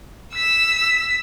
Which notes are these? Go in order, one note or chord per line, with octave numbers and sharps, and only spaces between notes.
E6 B6